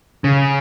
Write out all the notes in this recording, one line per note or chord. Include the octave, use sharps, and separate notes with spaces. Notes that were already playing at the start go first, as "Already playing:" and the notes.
C#3